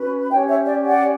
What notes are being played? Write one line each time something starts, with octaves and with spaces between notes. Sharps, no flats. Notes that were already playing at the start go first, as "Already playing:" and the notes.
Already playing: C#4 F#4 B4
C#4 G4 C#5 E5 G5
C#5 E5
D5
D5 F#5